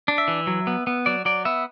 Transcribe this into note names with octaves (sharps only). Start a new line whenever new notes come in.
D4
E5
E3
F#3
B3
B3
F#3 D5
F#3 D5
B3 E5